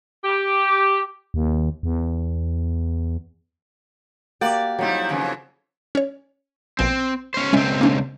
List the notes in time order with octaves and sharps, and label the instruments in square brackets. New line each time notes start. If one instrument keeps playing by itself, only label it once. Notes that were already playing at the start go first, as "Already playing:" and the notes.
[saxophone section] G4
[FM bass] D#2
E2
[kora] A#3 F#4 G4 [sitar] D5
[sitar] F2 G3 E4 [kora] F#3 A#3 D#4
[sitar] F2 C#3 E3
[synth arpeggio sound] C#4 C#5
[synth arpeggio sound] A#1 B2 G#5 [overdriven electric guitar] C4
[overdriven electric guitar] C#4 C5
[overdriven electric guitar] C#2 C4 [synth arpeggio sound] G#3 C#4 E5
[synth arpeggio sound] A#3 C#4 D4